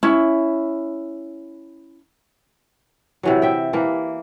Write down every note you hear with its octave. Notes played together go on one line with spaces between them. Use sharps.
C#4 E4
C3 E3 F#3
E5 G5
E3 A#3